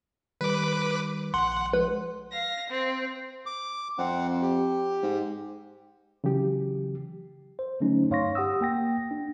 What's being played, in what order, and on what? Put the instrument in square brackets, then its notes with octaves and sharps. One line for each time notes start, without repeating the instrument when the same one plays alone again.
[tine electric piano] D#3 G3 [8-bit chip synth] B4 D6
[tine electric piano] A#1 [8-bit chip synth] F#5 [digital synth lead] C6
[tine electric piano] F3 G#3 [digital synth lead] B4
[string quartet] F5 A#6
C4
[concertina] D6
[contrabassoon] F2 [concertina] C4 F#5
[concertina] G4
[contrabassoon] G#2
[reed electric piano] C#3 E3 F#3 G4
[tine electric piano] C5
D3 F#3 A3 C#4 D#4
G2 C#5 F5 C6 C#6 A#6
G4 F#5 D#6 E6
A#3 G5 A#6
D4